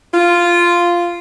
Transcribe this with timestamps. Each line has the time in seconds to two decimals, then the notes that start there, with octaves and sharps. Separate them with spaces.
0.13 F4